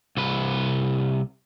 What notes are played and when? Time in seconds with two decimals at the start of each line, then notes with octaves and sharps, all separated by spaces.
0.17 C2 B4